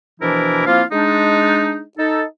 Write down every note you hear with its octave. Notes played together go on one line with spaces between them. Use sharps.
B2 E3 F3 D4 E4 A#4
F3 A#3 C4 E4 F4 F5
G#3 D4 D#4
D#4 A4